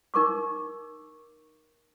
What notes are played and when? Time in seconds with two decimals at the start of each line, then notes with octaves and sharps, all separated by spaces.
0.14 D#4 A#4 C#6 D6